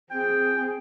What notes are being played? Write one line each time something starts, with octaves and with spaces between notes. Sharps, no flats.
C4 G#4 G5